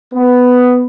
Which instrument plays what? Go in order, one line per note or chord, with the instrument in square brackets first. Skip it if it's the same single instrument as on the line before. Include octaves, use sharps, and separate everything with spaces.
[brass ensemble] B3